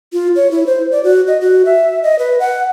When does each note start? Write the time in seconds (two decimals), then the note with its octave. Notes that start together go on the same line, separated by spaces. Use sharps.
0.13 F4
0.36 C#5
0.51 E4
0.67 C5
0.92 D5
1.04 F#4
1.27 D#5
1.41 F#4
1.65 E5
2.03 D#5
2.19 B4
2.40 F#5